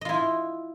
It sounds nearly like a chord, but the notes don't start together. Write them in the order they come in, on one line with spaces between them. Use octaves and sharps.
D#5 F4 E4